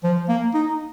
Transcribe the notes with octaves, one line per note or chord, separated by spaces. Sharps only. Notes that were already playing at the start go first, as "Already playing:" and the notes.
F3
A#3
D#4